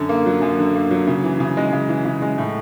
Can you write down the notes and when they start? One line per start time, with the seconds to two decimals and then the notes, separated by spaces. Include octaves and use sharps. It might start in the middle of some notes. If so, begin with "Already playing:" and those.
Already playing: F#2 D3
0.09 A#3
0.26 F#3
0.42 F#2
0.59 D3
0.75 A#3
0.91 F#3
1.07 C#3
1.24 E3
1.40 C#3
1.57 G#3
1.73 C#3
1.89 E3
2.05 C#3
2.22 G#3
2.38 A2